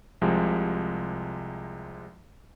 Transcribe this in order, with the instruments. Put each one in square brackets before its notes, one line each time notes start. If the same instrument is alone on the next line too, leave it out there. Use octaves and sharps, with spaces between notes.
[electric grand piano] C2 C3 F3 G#3